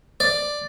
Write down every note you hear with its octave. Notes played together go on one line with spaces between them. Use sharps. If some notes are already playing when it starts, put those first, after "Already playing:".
D5